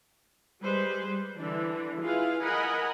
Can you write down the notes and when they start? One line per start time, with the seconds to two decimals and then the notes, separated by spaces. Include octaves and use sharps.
0.62 G3 G#3 B4 C5
1.07 G3
1.37 D3 E3 D4
2.02 E4 F4 G#4 B4 F5
2.43 A#4 D#5 F#5 G#5 B5